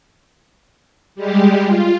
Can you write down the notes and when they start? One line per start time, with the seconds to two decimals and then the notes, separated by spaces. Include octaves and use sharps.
1.15 G3 G#3 G4
1.63 F4